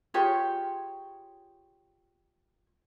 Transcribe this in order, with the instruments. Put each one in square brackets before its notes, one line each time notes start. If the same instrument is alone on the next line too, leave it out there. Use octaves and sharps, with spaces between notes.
[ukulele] F4 G4 G#4 C#5